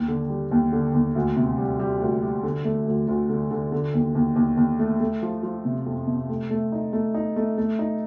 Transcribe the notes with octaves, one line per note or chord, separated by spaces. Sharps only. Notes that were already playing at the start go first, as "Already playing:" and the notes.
Already playing: D#2
D3
G3
D#2
D3
D#2
D2
C3
G3
G3
D2
G3
D3
A3
D2
D2
D3
D3
D3
D#2
D#2
D#2
D#2
A3
A3
F3
F3
C3
F2
C3
A3
A3
D#4
A3
D#4
A3
A3
D#4